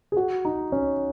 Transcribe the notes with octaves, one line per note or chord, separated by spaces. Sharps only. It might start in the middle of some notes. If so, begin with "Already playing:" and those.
G#4
F#4
D#4
C#4